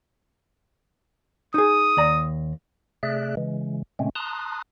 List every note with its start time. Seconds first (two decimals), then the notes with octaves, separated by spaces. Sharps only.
1.54 D#4 G#4 D#6
1.97 D#2 D5 A#5
3.03 C3 A3 G#4 D5 E5 F#6
3.37 C#3 E3 G#3
3.99 A#2 C#3 G#3 A3 C4 C#4
4.15 A5 A#5 C6 D#6 F#6